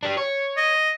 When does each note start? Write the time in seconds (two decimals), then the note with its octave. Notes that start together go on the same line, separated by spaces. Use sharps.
0.03 D4 G4
0.17 C#5
0.57 D#5